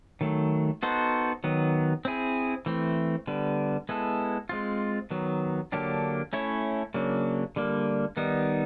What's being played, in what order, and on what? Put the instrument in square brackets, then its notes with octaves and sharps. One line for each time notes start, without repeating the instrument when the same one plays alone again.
[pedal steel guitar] D#3 F#3 A3
B3 D#4 F#4 A4 C5
D#3 F#3 B3
C4 E4 G#4
E3 A3 C4
D3 G3 B3
G#3 B3 E4 A4
G#3 C4 F4
D#3 F#3 B3
D3 F#3 A#3 D4 G4
A3 C#4 E4 A4 C#5
C#3 F#3 A#3 D4
D3 G3 A#3
D#3 G3 B3 D#4